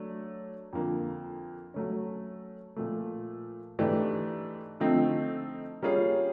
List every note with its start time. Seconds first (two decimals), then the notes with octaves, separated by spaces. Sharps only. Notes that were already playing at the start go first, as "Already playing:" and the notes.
Already playing: F#3 A3 D4
0.73 F2 D3 F3 A#3
1.74 F#3 A3 C#4
2.76 A#2 F3 A3
3.79 G#2 E3 A3 D4 G4
4.80 D3 F3 A3 C4 D#4
5.83 G3 A#3 C#4 F4 G#4